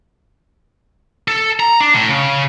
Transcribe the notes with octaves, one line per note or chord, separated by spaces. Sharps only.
A4
A#5
D4
A2
C#3